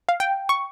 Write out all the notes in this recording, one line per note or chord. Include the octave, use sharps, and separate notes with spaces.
F5
G5
C#6